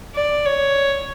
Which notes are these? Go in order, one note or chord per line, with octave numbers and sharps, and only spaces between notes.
D5
C#5